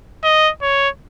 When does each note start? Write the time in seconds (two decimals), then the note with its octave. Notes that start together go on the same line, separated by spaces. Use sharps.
0.24 D#5
0.62 C#5